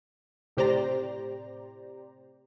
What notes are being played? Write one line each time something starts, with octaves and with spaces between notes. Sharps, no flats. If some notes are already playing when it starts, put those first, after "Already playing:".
A2 C3 G4 C5 D5 A#5